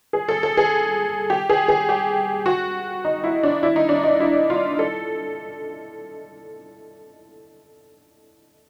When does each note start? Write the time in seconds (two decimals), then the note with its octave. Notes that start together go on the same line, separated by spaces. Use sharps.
0.13 G#4
0.29 A4
0.43 A4
0.57 G#4
1.30 G4
1.50 G#4
1.68 G#4
1.89 G4
2.46 F#4
3.05 D#4
3.24 E4
3.43 D4
3.63 E4
3.76 D#4
3.89 D4
4.03 D#4
4.20 E4
4.50 F4
4.79 A4